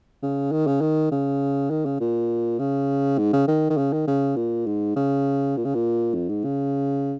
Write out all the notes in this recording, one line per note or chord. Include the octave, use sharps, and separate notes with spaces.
C#3
D#3
C#3
D#3
C#3
D#3
C#3
A#2
C#3
G#2
C#3
D#3
D#3
C#3
D#3
C#3
A#2
G#2
C#3
A#2
C#3
A#2
F2
G#2
C#3